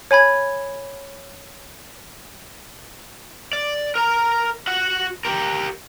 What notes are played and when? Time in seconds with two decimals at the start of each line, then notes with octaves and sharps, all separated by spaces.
0.11 C#5 G#5 B5 G#6
3.53 D5
3.95 A#4 A#5
4.67 F#4 F#5
5.25 G4 A#4